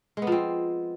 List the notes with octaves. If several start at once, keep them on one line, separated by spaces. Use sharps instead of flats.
F3 G#3 B3 C4